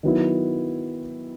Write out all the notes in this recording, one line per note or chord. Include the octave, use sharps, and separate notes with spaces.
D#3 F#3 B3 E4